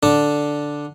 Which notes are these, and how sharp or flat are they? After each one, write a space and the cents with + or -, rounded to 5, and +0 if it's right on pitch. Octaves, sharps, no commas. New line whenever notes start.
D3 +0 D4 +0